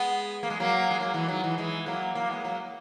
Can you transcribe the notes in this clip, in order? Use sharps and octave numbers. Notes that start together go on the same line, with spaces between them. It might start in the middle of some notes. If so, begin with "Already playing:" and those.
Already playing: G#3 B3
A#3
G#3
F#3 A#3
G#3
F#3 A#3
E3 G#3
D#3 F#3
E3 G#3
E3 G#3
F#3 A#3
F#3 A#3
G#3 B3
F#3 A#3